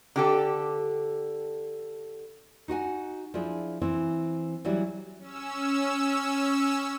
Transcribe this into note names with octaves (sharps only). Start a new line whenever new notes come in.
D3 G4 A4
D#4 F#4 F#5 G#5
F3 D4 E4 G#4
E3 C4 E4
E3 F#3 G3 E4
C#4 E6